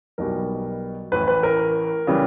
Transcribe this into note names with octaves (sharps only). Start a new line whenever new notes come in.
B1 B2 G3 A#4
A1 A2 E3 B4
B4
A#4
C#3 E3 G3